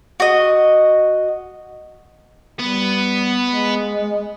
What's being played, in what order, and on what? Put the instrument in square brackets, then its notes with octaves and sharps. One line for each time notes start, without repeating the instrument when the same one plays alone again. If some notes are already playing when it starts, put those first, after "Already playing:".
[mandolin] F#4 D#5
[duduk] G3 [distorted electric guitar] B3
[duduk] G#3